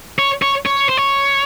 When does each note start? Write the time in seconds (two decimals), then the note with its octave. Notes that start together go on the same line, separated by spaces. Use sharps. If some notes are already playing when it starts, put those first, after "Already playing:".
0.19 C#5
0.42 C#5
0.66 C#5
0.89 C5
0.97 C#5